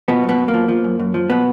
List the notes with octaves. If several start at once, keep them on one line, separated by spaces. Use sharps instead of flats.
B2 F3 B3
F#2
B2 B3
F#2
A#3
F3
F3
F#2
F#2
F3
B2 B3